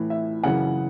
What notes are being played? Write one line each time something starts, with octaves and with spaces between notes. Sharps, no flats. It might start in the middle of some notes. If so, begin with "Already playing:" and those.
Already playing: A2 E3
E5
F#2 C#3 E3 F#5